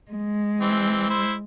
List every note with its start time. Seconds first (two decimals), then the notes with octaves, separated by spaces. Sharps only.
0.11 G#3
0.61 E3 C4
1.10 E4 C5